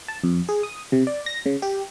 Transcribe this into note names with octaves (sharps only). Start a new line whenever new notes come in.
A5
F2
G#4
D#6
C3
D5
A#6
C#3
G4